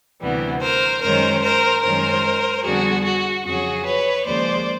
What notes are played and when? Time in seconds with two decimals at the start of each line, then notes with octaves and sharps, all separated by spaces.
0.22 D2 C3 E3 G3 B3
0.62 A#4 C5
1.02 F#2 D#3 G#3 C#4 A#4 C5
1.43 A#4 C5
1.83 F#2 D#3 G#3 C#4 A#4 C5
2.64 F2 D3 G3 B3 D4 F#4 G#4
3.05 F#4
3.45 F2 C#3 F#3 F#4 G#4
3.85 B4 C#5
4.26 D#2 C#3 F3 G#3 C5 D5